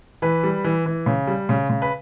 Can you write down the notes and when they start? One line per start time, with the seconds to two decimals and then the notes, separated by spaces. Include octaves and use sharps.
0.22 E3 B4
0.43 G3
0.64 E3
0.86 E3
1.06 C#3
1.27 G3
1.49 C#3
1.70 C#3
1.82 B4